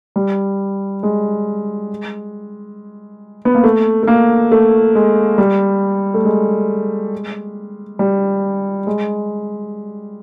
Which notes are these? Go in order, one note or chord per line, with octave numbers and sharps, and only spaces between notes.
G3
G#3
B3
A#3
A3
A3
A#3
A3
G#3
G3
A3
G#3
G3
G#3